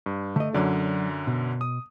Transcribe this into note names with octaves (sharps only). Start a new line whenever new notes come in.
G2
D3 A3 D#5
F#2 D3 F#3 D5
B2
D#6